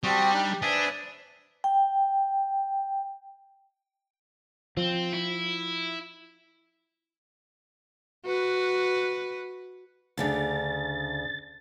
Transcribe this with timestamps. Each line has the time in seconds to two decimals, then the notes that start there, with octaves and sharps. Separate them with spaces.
0.04 G3 C4 F#4 G4 G5 A5 D#6
0.33 D4 D#4
0.62 D4 B4 C5 E5 G#5 D#6
1.64 G5
4.77 F3 C4
5.13 E4
8.26 F#4 B4
10.18 D2 C#3 D4 A6